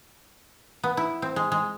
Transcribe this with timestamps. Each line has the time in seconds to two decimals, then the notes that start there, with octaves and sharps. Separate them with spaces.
0.83 B3
0.97 E4
1.22 C4
1.36 G#3
1.52 G#3